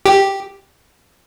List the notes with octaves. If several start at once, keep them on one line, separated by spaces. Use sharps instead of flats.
G4